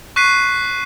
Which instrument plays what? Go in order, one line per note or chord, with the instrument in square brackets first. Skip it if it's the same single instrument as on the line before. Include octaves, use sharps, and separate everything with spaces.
[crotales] C#6 F#6 B6 C7 D#7